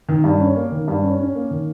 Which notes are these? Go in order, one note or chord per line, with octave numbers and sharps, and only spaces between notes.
D#3
G2
C#4
A#3
D#3
G2
C#4
C#4
A#3
D#3